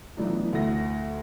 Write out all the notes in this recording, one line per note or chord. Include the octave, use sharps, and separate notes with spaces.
E3 F#3 A3 B3 D4 D#4
D2 A3 A4 A#6